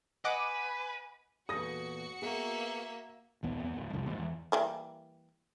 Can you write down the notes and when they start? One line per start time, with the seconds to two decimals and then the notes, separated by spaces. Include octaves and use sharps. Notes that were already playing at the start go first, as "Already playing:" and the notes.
0.24 B4 D#5 F#5 G#5 D6
1.49 E2 A#2 F#4 A4 D#6 A#6 C#7
2.22 A#3 B3 G#4 E5
3.43 A#1 D#2 B3
3.63 E2 B3
3.77 D1
3.93 C2 F2
4.06 D#2 G#2
4.18 E2
4.52 E3 G3 A#3